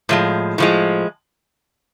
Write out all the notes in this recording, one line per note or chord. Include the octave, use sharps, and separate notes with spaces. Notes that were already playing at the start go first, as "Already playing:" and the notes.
A2 F3 G#3
A2 F3 G#3